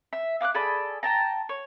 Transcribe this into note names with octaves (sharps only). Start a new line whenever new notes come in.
E5
F5 D6 F6 F#6
G#4 A4 D5 B5
G5 A5 A#5
C#5